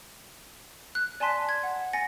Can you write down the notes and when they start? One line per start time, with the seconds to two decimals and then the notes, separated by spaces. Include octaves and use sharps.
0.95 F#6
1.20 D5 G#5 A5 C6 B6
1.49 G#6
1.63 F#5
1.93 G#5 A6 A#6 C#7